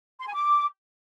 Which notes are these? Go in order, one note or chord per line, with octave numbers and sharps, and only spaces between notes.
C6
G#5
D6